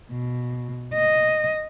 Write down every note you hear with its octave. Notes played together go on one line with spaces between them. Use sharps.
B2
D#5